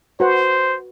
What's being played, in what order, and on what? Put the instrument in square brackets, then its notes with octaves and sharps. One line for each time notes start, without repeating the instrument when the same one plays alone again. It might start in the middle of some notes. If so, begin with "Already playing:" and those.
[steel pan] F#4 B4 F#5 [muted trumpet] C5